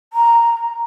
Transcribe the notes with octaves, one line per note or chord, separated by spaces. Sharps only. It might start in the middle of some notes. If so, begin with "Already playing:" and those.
A#5